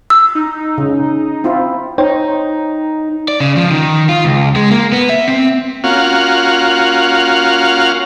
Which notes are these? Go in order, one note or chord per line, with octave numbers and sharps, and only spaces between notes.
E6
D#4
C#3
C4 E4 F4
D#4 C5 C#5 G5
D5
C#3
F3
D#3
F4
C#2
G#3
A#3
B3
E5
C4
A#3 C#4 F4 F#4 F5 F#5